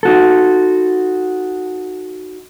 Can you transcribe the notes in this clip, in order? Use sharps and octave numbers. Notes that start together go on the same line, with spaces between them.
D#4 F#4 A4